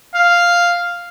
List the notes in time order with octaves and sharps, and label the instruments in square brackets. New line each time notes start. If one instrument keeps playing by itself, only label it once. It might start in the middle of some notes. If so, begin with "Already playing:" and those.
[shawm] F5